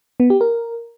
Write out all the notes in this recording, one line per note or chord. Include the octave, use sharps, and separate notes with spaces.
B3
G4
A#4